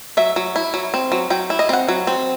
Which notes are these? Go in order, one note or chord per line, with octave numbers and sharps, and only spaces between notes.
F#3 E5
F#3
E4
F#3
C4
F#3
F#3 G5
E4
D#5
C4 F#5
F#3
C4